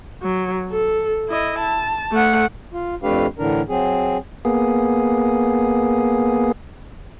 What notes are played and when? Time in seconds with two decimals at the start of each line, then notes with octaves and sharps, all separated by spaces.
0.22 F#3
0.71 A4
1.29 E4 D#5
1.59 A5
2.12 A3 F#5
2.73 F4
3.03 F2 A3 D4 G4 B4 F5
3.39 A2 D3 E3 D4 A#4
3.69 F#3 C4 G#4
4.45 A#3 B3 G#4